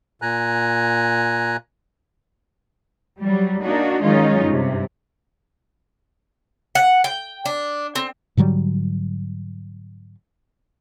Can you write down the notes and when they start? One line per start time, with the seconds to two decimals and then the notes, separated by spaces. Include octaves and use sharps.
0.22 A#2 G#5 A#5 F#6
3.21 F#3 G3
3.61 A#3 D4 D#4 F#4
4.02 D#3 F#3 G#3 C#4 D#4 F4
4.46 G2 C3
6.75 F#5
7.04 G5
7.46 D4
7.95 C4
8.37 G#2 D3 F#3 G3